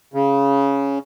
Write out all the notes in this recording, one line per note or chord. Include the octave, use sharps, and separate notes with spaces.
C#3